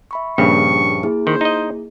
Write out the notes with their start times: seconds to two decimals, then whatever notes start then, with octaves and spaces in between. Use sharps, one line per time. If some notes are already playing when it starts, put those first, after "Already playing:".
0.11 E5 B5 C#6
0.38 A#1 G2 C#3 A#3 C#6
1.03 A#3 E4 G#4
1.27 D#3 C5
1.41 D#4 D#5